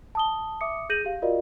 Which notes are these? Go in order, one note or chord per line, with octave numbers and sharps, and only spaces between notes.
A5 D#6 G7
E5 D6 D#6 C#7
G#4 G6 A#6 D#7 F#7
G4 F5
F4 F#4 A#4 D5 D#5 F5